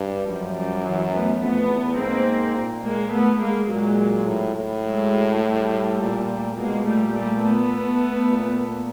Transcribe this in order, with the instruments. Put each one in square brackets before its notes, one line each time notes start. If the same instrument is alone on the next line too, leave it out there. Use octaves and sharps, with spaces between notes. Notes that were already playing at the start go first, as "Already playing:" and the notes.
Already playing: [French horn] G2
[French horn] F#2 [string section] F3 G3
[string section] F3 G3
E3 F#3
A3 B3
[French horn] F2 [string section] A3 B3
[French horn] E2
[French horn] G#2 [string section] A#3 C4
[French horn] A#2
[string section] G#3 A#3
A3 B3
G#3 A#3
[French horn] A#2 [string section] F#3 G#3
[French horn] A2
A2
[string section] F#3 G#3
G3 A3
[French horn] A#2
[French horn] B2 [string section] G#3 A#3
[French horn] A#2 [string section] G3 A3
[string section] G3 A3
A3 B3
[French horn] A#2